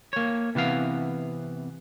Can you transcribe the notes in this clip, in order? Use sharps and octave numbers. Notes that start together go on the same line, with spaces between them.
A#3 C#5
C3 E3 B3 F5